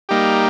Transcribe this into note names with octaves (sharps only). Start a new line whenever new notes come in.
G3 A#3 D#4 G4